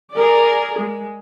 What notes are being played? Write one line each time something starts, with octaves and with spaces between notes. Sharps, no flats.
G#4 A#4 D5
G#3